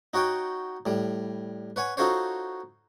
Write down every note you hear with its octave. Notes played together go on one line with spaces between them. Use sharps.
D#4 F#4 C#5 F#5 G5
A2 G3
B4 C#5 F#5 G#5
D#4 F4 F#4 A4 C5 C#5